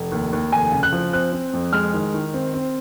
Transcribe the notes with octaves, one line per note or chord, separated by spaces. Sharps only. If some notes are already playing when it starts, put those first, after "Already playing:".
Already playing: F1
D#2
D#2
F1 G#5
C#3
F#6
F3
C4 F#6
C4
F2
G#3 F6
D#3
D#3
C4
C4